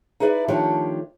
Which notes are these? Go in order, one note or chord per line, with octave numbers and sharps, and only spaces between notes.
D#4 E4 G#4 B4 D5
D#3 F3 A3 D4 G4 C#5